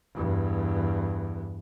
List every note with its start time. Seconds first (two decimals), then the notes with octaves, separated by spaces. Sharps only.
0.14 E2 G2